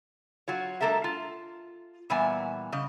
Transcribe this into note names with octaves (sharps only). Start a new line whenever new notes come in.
F#3 F4 C#5
G#3 A#3 A4 A#4 E5
F4
A#2 E3 G3 B3 E5 G#5
C#3 G3 D#5